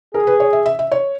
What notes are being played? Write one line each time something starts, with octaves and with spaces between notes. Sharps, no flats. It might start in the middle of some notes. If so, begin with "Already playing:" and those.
G#4 A#4
B4
C#5
E5
E5
E5
C#5